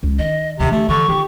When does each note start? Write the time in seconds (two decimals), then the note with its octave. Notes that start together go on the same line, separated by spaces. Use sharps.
0.03 C#2
0.19 D#3 D#5
0.59 D2 C3 E3 G4
0.72 D3 A3
0.88 D3 E3 C#6
1.08 D#3 F4 G4